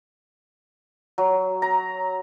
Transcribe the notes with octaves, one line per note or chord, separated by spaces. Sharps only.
F#3
A#5